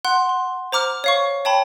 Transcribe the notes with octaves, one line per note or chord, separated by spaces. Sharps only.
F#5 C6 F#6
C6
C5 A#5 D6 F6
C#5 F5 C#6
C#5 G5 A5 B5